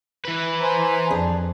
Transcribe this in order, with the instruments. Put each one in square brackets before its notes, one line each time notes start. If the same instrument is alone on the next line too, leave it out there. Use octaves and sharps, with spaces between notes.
[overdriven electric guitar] E3 B4
[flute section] C5 G#5 A#5
[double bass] F2 [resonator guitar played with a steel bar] D4 G#4